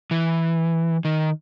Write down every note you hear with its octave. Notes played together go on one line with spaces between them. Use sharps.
E3
D#3